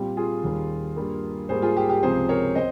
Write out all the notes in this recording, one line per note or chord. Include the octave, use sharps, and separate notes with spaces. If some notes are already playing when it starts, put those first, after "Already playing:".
Already playing: A#2 G3 C4 G4
F4 G#4
D#2 D#3 G3
G2 G3 A#3
G#2 G3 A#3 G#4 C5
F4 G#4
G4
G4
C#2 C3 F3 C4 G#4 C5
A#4 C#5
C4 C5 D#5